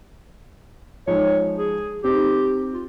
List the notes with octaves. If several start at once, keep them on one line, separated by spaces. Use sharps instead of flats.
F3 G#3 D#4 C#5
G#4
C4 D#4 G4
F4